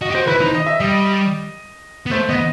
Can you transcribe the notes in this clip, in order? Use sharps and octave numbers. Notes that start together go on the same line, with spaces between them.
F#4 D#5
G4
F#4 C5
E4 B4
D#4 C5
D#5
E5
G3 D#5
D#5
B3
A3 C5
B3 D#5